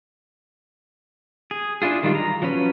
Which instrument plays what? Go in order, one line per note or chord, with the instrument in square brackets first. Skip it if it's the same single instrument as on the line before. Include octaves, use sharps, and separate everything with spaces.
[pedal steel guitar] G#4
D4 E4 F4 G#4
D#3 G3 G#3 F4
A#5
F3 F#3 C#4 B4